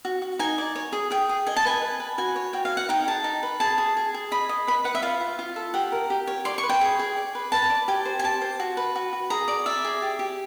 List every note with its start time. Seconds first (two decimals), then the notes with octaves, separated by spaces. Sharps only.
0.05 F#4
0.22 F#4
0.39 D#4 G#5
0.58 D5
0.76 C#5
0.93 G#4
1.11 G#4 G5
1.29 G#4
1.47 D#5 G#5
1.57 A5
1.65 B4 G#5
1.82 B4
2.00 B4
2.18 F#4 G#5
2.36 C#5
2.53 F#4 G5
2.65 F5
2.71 C#5
2.77 F#5
2.89 D#4 G5
3.07 G#4 A5
3.24 D#4
3.43 B4
3.60 G#4 A5
3.78 G#4
3.97 G#4
4.14 G#4
4.32 D#5 B5
4.49 D#5
4.67 B4 B5
4.84 B4 F#5
4.95 E5
5.02 F4 F5
5.21 F4
5.39 F4
5.56 A4
5.74 G4 F#5
5.92 A#4
6.10 G4
6.27 C#5
6.45 D5 C6
6.58 C#6
6.63 B4
6.69 G5
6.81 G#4
6.99 G#4
7.17 D5
7.35 B4
7.52 B4 A5
7.70 D5
7.88 G4 G#5
8.06 C5
8.19 G#5
8.24 G4 A5
8.42 C5
8.60 F#4
8.77 B4
8.96 F#4
9.13 F#4
9.30 G#4 A#5
9.48 D5
9.66 D5 E5
9.85 G#4
10.02 G4
10.19 G4